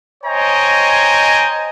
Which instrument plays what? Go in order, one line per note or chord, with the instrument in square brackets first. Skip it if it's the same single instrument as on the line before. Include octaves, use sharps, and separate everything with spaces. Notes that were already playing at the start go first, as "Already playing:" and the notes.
[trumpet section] C5 C#5 D#5 G5 G#5 A#5